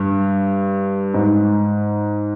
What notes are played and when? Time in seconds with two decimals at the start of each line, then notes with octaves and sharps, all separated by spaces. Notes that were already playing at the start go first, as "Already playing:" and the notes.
Already playing: G2
1.14 G#2